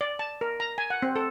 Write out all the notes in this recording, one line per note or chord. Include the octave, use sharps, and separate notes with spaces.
D5
A5
A#4
A#5
G#5
F#5
C4
A4